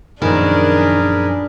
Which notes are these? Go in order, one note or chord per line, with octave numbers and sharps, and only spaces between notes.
F#2 A#2 D#3 F3 D4 G#4 A#4 B4